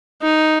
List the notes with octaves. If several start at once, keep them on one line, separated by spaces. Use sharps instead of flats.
D#4